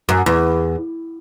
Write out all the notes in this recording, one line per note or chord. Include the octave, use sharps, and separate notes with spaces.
F#2
E2